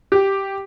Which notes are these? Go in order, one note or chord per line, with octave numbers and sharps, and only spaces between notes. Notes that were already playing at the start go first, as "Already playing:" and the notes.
G4